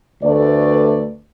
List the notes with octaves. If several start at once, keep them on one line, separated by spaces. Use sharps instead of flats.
D2 A3 B4 D5